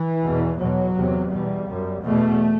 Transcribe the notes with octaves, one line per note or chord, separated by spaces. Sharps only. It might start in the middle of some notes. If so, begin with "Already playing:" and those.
Already playing: E3
E2 B2
E2 B2 F#3
E2 C3
E2 B2 G3
F#2
E2 B2 A3